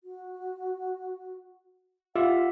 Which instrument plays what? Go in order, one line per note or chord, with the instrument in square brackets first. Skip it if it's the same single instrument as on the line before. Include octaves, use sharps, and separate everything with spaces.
[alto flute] F#4
[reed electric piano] F4 E6 [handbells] G4 E5 [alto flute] F#5